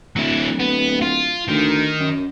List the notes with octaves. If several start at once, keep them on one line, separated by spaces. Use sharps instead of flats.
D1 F#3 E4
B3
F4
D2 D#3
F#2